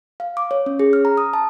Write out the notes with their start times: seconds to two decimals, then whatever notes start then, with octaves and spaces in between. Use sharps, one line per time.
0.20 F5
0.37 D6
0.51 C#5
0.66 C#4
0.79 G#4
0.93 F6
1.05 A#5
1.17 D#6
1.33 A5